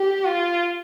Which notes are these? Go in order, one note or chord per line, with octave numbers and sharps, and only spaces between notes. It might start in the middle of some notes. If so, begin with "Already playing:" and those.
Already playing: G4
F4